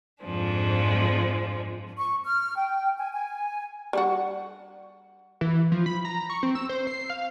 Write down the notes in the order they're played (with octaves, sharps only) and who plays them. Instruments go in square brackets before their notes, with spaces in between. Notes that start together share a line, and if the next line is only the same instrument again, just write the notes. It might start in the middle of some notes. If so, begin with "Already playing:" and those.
[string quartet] F2 G#2 F3 G#3 D4
[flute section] C#6
F6
G5
G#5
G#5
[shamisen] G3 D4 F#4
[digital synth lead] E3
F3
B5
A#5
C#6
C4
E6
C5
C7
F5